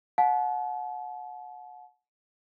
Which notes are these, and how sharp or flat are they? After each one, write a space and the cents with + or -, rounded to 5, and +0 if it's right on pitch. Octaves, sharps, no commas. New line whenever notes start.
F#5 -30 A5 -40